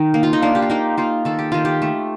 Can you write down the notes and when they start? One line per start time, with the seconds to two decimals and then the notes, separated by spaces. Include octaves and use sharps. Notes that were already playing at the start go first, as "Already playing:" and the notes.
Already playing: D#3 D#4
0.14 A#3
0.23 F4
0.33 D#4
0.42 A#3 D4
0.55 G4
0.62 F4
0.70 A#3 D#4
0.97 A#3 F4
1.25 D#3 A4
1.39 G4
1.52 D#3 F4
1.65 G4
1.82 A3